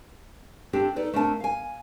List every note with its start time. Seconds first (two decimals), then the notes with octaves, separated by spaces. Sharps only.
0.73 C4 D4 G4 A4
0.96 D#4 A4 B4 D5
1.13 A3 A#3 C4 D4 G#5 A5
1.40 F5 G#5